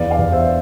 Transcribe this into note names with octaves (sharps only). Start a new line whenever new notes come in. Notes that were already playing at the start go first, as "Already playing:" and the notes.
Already playing: E2 D5 F5
D5 F5
E2
C5 E5